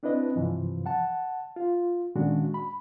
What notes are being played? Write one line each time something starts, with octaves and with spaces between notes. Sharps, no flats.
C4 D4 E4 B4 D#5
G2 C3 E3 F3
F#5 A5
F4
A#2 D#3 G#3 C#4 D4 F#4
B5